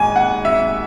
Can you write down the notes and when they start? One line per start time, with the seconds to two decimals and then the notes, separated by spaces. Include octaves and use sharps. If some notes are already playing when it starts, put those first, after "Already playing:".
Already playing: G#1 G#2 G#5
0.16 F#5
0.45 E5